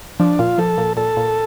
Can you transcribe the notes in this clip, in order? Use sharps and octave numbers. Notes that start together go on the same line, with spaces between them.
F3 D4
A#2 F4
F3 A4
A#2
A#2 A4
A#2